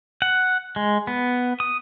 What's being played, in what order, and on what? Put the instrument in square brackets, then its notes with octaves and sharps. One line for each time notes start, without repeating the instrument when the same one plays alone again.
[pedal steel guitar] F#5
G#3
B3
D#6